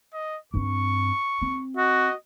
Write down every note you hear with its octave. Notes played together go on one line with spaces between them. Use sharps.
D#5
G2 C4 C#6
C4
F#4 D#5